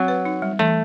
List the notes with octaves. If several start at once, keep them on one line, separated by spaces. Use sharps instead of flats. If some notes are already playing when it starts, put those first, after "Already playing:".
Already playing: F#3 C4
B4
D#4
G3
E3 A3